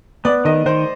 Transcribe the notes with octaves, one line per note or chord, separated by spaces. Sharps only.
B3 D5
D#3 D#5
D#3 C5